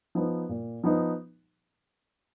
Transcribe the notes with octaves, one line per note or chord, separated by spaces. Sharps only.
F3 B3 D#4
A#2
F3 B3 D#4